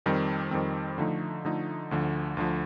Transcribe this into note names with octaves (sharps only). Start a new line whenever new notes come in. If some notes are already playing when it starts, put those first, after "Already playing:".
F2 D#3 G3 C4
F2 D#3 G3 C4
D3 F3 A3 D#4
D3 F3 A3 D#4
D2 D3 F3
D2 D3 F3